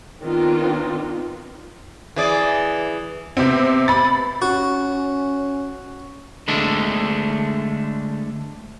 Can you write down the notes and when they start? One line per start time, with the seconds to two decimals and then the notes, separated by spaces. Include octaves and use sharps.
0.22 D#3 B3 C4 D4 D#4 F4
2.16 E3 G#4 D5
3.37 C3 B3 C4
3.88 B5 A6
4.42 C#4 F#4
6.48 D3 G#3 A3 D4